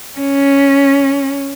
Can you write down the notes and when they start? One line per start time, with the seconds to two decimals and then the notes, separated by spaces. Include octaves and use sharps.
0.19 C#4